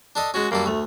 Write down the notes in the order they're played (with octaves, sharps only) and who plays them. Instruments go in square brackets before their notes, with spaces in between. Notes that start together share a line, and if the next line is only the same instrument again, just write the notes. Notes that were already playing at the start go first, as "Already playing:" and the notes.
[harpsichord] D4 A4 D#5
[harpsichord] G#3 C#4 [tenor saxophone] F#4
[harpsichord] F#2 G3 A4 [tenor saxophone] A#3
[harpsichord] D2 [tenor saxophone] A3